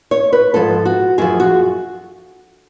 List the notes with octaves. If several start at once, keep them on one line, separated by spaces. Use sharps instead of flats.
C#5
B4
G#2 F3 A4
F#4
F#2 F3 G#4
F#4